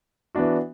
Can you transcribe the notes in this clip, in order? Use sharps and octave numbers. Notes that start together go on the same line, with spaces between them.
E3 B3 D4 F#4